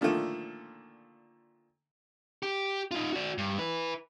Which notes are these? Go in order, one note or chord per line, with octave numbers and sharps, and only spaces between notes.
A#2 D3 D#3 F3 A3
G4
D#4 F4
F#4 D5
G2
E4 B4